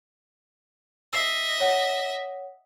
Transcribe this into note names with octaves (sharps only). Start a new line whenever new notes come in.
D#5 E5 E6 C7
C#5 F#5